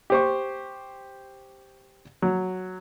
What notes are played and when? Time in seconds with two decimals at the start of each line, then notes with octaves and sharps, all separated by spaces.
0.10 G4 C5 C#6
2.22 F#3